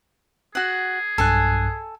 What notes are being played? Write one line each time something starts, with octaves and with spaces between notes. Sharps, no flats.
F#4 G#4 F#5
B1 G2 A4 G#5 F#6